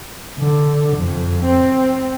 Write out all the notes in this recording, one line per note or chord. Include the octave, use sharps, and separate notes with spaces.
D3
F2
C4